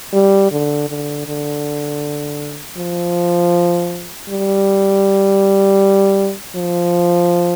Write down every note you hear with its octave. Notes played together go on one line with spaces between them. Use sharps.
G3
D3
D3
D3
F3
G3
F3